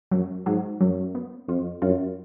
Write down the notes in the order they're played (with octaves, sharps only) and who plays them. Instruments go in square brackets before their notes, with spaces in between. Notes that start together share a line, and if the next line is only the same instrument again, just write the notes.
[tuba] F#2 [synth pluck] F#3
[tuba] G#2 [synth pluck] F#3
[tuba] F#2 [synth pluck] F#3
[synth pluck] B3
[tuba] F2 [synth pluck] F4
[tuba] F#2 [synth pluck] F4